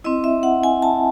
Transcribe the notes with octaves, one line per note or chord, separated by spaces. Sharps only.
C4 E4 D#5
E5
F#5
G#5
A5